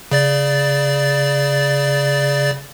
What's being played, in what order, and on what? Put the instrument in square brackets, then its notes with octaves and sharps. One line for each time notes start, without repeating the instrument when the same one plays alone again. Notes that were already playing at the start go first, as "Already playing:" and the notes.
[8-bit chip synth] C#3 D5 A6